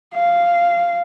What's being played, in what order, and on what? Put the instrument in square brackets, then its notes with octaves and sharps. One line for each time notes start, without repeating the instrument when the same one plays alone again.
[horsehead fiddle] F5